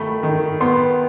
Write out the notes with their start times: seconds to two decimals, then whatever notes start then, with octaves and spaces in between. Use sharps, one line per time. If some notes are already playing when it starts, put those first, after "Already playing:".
Already playing: D#3 A3 B5
0.23 D#3
0.60 B3 C6